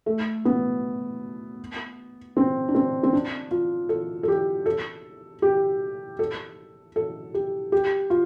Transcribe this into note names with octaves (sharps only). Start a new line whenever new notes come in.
A3
B3
C4
D4
C4
C4
D4
F4
A4
A4
G4
A4
G4
A4
A4
G4
G4
F4